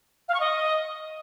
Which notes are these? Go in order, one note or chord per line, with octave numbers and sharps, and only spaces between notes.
F5
C#6
D#5